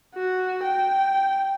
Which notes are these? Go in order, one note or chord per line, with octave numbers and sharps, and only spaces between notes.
F#4
G5